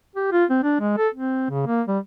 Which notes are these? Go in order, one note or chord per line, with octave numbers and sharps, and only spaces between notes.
G4
F4
C4
D4
G#3
A4
C4
C#3
A#3
G3